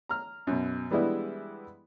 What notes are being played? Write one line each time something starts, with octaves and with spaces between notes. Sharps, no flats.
A#5 F6
F#2 B2
E3 G3 G#3 B3 D4 E4